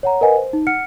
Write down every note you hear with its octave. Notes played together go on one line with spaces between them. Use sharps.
C#5 F#5 A#5
A#4 B4 D#5 F#5 G#5
C5
D#4
F#5 F6 C#7